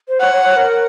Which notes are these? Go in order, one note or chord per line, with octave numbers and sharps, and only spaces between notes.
C5
C#5 F#5
C#5
C#5
A#4